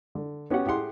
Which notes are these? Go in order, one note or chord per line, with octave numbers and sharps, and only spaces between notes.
D3
B3 C#4 F#4 G4 C#5 F#5
A2 G4 G#4 F#5 C6